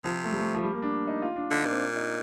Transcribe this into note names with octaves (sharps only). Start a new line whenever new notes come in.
C3 F3
A3
G3
A3
F3
G3
A#3
D4
D#4
F4
D4
D3 D#4
D4
A#2
C4
D#4